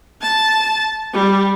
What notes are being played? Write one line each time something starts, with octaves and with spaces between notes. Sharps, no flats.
A5
G3